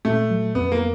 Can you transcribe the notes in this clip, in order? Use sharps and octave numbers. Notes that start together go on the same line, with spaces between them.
A#2 A3
F#3
F2 B3
A#3